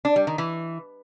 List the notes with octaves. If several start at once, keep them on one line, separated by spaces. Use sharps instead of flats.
D4
G3
D#3
E3